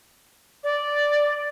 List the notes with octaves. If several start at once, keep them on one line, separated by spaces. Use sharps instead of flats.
D5